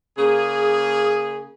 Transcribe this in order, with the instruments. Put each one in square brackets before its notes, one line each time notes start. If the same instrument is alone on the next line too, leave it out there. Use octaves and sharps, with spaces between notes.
[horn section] C#3 A#3 G#4